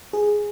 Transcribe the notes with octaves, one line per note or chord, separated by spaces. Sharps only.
G#4